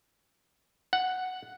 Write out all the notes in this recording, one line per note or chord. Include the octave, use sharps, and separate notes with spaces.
F#5